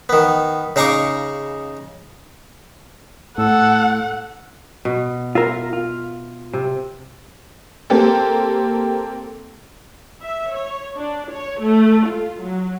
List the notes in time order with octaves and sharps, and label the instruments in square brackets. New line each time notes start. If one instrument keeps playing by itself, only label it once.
[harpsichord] D#3 B3
C#3 D#4 F5 A#5 C#6 D6
[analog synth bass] A2 [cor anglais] A4 [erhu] F#5
[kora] B2
[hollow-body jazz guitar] F4 A#4 [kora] E5 F5
[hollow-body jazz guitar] F4
[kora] C3
[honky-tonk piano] A#3 C4 G4 A4
[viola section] E5
C#5
D4
C#5
A3
F4
F#3